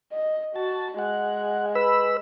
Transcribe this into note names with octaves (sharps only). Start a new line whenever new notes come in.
D#5
F#4 A5
G#3 F#5
B4 B5 E6